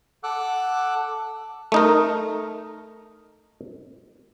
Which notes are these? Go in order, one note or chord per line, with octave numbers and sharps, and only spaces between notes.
A4 F#5 D6 E6 F#6
A3 D#4 A#4